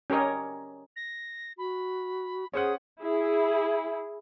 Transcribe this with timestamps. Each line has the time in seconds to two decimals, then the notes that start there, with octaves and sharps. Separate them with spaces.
0.10 C#4 G4 A#4 C#5 D#5
0.96 A#6
1.58 F#4 B5
2.54 C#4 G#4 C5 F#5 D#6
3.01 E4 G#4